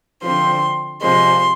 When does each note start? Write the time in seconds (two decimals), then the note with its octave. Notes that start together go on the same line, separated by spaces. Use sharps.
0.22 D3 F3 C4 C6
1.01 C3 F3 G#3 C6